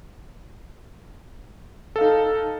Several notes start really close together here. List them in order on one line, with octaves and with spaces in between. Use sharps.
A4 F5 D#4